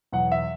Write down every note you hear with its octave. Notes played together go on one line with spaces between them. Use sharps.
E2 B2 F#3 F#5
E5